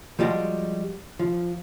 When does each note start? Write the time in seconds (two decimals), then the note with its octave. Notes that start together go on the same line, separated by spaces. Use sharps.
0.19 F3 G3 G#3 F#4 G4
1.19 F3